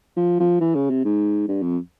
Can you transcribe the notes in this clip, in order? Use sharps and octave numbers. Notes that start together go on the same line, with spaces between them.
F3
F3
E3
C#3
C3
G#2
G2
F2